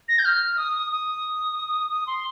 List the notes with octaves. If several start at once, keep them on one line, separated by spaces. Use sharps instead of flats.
A#6
G6
F6
D#6
D#6
D#6
C6